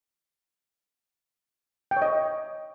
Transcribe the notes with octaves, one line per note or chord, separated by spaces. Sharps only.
G5
C#5
D#5